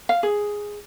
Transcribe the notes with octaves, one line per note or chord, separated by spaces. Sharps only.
F5
G#4